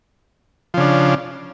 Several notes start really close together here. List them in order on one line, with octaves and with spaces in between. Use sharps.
F3 C#3 D4